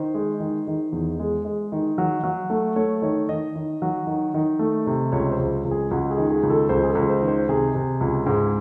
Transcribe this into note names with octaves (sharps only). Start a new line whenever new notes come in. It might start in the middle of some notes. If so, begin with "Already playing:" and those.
Already playing: D#3 C5
G#3
D#3
D#3
E2
G#3
G#3
D#3
F#3
F#3
A3
A3 C#5
D#3 C#5
D#3 D#5
D#3
F#3
D#3
D#3
A3
C3
C#2 C#5
C5
C#2
C#2
G#4
C#2 F#4
G#4
D#3
G#4
C#2
A4
C#2 C5
G#4
A4
C#2
C5
D#3
C5
C3 G#4
C3
C#2
G#2